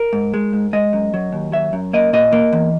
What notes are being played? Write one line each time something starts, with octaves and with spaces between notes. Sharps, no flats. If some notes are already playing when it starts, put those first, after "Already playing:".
Already playing: A#4
G#2
G#3
G#2
G#3 D#5
F#2
F#3
D#2
F#3 E5
F#2
A#3 D#5
A#2 D#5
A#3
E2